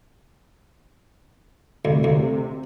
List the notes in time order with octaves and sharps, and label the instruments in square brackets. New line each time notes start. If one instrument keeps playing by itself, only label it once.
[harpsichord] D2 [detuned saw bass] C3
[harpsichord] D2